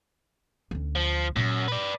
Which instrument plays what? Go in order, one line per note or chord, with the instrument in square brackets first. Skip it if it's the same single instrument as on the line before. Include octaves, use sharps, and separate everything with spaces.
[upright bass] D2 C#4
[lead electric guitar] F3
[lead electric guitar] F#2 [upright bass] A#2
[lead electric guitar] B4 D5